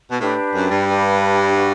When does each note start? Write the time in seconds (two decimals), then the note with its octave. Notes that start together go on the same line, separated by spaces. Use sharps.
0.11 B2
0.20 A2 D4 G4 B4
0.54 F#2
0.71 G2
0.88 D4 G4 B4
1.56 F#4 B4 D5